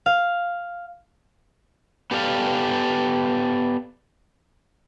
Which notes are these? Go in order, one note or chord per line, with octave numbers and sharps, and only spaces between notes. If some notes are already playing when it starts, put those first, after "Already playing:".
F5
B3 G4 A4 D5 F5